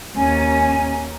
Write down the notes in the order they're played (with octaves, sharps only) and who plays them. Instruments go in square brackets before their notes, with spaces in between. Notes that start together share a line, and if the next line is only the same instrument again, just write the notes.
[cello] D#2 C#4 [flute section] G#5 A#5